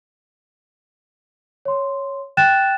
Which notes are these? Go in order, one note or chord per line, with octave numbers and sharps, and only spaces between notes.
C#5 C6
G5 F#6 A6 E7